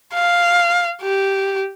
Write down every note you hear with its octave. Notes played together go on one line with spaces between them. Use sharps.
F5
G4